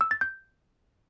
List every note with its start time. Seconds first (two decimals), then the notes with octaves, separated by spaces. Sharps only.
0.01 E6
0.11 A6
0.21 G6